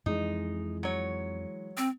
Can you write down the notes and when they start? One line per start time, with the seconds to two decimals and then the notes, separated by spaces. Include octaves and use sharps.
0.06 F2 E3 G#3 D#4
0.83 F#3 C#5
1.77 C4